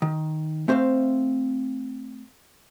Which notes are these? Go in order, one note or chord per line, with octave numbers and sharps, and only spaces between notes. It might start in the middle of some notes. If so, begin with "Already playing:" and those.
D#3
A3 C4 C5 E5 F5